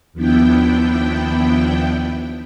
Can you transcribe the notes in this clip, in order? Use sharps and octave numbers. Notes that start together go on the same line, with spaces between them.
D#2 F3 B3 D4 E4 G5